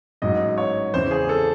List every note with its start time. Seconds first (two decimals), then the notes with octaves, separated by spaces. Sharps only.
0.22 A1 G#2 F#3 D#5
0.58 C#5
0.94 E2 C#3 E3 C5
1.11 G#4
1.29 A4